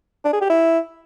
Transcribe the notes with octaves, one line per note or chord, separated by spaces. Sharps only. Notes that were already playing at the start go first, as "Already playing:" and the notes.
D4
G#4
G4
E4